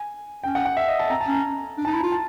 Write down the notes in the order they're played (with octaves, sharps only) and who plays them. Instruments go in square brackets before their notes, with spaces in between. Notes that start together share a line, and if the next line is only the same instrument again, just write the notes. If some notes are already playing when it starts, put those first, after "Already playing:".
Already playing: [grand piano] G#5
[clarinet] C#4 [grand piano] G5
[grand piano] F#5
F#5
E5
D#5
A5
[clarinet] C4 [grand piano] A#5
[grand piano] A5
[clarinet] C#4 [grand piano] A#5
[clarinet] D4
[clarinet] D#4 [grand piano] A5 A#5
[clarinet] E4
[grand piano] A5
[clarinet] F4
[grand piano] A5